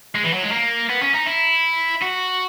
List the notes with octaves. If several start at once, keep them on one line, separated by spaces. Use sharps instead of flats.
G#3
E3
F#3
G#3
A#3
B3
C#4
D#4
E4
F#4